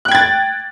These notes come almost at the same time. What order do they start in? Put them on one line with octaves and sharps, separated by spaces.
F#6 G5 G#6 A6